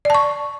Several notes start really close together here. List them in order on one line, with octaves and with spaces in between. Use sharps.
D5 A5 C#6